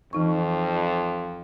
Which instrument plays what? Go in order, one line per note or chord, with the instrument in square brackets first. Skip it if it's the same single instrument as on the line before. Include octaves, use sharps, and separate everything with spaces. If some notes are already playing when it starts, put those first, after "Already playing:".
[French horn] F2 [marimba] E3 D#4 C#6